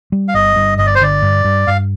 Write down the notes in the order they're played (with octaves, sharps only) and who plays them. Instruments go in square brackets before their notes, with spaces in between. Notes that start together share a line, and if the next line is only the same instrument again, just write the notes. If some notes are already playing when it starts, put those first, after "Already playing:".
[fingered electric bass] G3
[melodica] F5
[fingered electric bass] G1 [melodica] D#5
[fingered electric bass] G2
[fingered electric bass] G1 [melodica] D#5
[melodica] D5
C5
[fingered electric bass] D3 [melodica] D5
[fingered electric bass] G2
G2
[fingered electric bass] G2 [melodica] F5